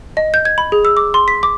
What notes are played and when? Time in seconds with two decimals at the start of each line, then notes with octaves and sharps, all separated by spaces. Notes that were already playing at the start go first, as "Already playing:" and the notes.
0.17 D#5
0.34 G6
0.45 G#6
0.58 B5
0.72 G#4
0.85 E6
0.97 D6
1.14 C6
1.28 B6
1.43 D6